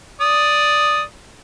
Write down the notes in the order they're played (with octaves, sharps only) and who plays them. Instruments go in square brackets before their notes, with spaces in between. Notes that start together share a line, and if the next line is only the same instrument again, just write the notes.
[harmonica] D5 D#6